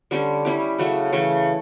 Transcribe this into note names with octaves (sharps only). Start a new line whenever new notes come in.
D3 G3 C#4 G4
G3 C#4 E4 G4
C#3 F#3 A3
C#3 E3 A3 C#4